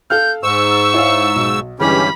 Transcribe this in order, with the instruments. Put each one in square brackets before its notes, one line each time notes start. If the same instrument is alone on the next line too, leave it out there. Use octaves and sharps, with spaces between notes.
[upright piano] A4 F5 F6 [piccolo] G6
[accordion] G#2 E6 [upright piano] C5 [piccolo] C#6
[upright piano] E4 C#5 F5
B1
[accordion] G2 C#4 G4 [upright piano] D3 E3 G#3 [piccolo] B5